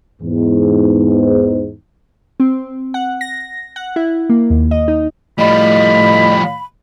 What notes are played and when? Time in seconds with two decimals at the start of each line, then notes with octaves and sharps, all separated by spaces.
0.22 E2 G#2
2.40 C4
2.94 F#5
3.21 A#6
3.76 F#5
3.96 E4
4.30 A#3
4.50 D#2
4.71 D#5
4.88 D#4
5.39 A2 F3 G3 D#5 B5